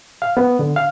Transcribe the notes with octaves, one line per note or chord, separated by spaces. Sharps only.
F5
B3
D3
F5